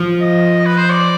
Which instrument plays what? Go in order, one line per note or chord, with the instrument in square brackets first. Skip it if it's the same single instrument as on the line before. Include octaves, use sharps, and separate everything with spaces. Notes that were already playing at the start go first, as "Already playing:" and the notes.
Already playing: [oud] F3
[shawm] D#5
B4
C5
D5